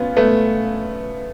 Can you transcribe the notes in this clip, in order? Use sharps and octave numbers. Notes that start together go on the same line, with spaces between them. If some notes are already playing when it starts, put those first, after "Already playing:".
Already playing: B3 C#4 F4
A3 B3